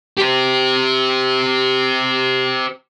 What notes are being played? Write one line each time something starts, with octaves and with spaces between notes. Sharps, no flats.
G4 C5